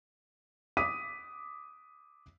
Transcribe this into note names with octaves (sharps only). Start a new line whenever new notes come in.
D6 D#6 B6 D#7